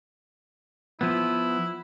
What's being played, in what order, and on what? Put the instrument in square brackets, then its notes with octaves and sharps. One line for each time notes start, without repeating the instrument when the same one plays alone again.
[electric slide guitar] F3 B3 [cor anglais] E4